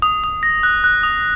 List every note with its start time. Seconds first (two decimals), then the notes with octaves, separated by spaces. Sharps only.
0.02 D#6
0.24 D#6
0.43 A#6
0.63 F#6
0.84 F#6
1.03 D#6